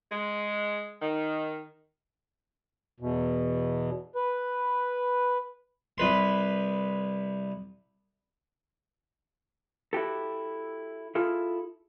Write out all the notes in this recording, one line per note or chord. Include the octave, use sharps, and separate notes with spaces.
G#3
D#3
E2 B2
B4
C2 B4 C6
E4 F#4 G4 A4
E4 F4 G#4 A4